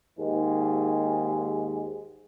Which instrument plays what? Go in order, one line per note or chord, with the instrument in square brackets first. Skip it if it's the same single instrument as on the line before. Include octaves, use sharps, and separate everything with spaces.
[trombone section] D#2 G#2 G#3